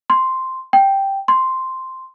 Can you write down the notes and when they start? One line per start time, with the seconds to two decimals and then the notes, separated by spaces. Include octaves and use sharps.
0.10 C6
0.73 G5
1.28 C6